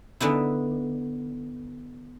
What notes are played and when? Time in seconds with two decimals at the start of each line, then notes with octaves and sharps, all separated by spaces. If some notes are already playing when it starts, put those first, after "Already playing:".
0.20 D3 B3 D#4 E4